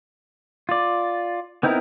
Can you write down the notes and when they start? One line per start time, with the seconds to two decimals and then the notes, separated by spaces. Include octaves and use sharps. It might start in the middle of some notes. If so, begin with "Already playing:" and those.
0.69 F4 D5
1.63 B3 C4 D#4 E4 A#4